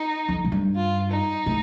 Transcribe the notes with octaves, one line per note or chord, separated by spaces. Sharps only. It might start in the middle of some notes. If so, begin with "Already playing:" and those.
Already playing: D#4
F2
A2
G2
F4
D#4
A2